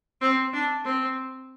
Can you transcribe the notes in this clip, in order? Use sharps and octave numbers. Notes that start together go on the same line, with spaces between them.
C4
D4
C4